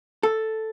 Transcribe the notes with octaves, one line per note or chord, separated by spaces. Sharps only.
A4